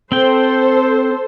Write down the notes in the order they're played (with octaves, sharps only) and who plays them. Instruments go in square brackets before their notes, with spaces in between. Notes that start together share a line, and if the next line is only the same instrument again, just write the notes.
[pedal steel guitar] C4 G5 [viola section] A4 C5